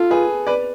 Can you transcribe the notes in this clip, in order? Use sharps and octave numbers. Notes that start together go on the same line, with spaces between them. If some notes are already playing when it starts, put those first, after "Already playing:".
Already playing: F4 A4
G#4 B4
B4 D5